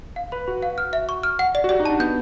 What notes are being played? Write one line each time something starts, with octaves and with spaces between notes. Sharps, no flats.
F5
B4 B5
F#4 B5
F5
F6
E5
C#6
F6
F#5
D5
F#4
G4 D5
D#4
D4 A5
B3 G6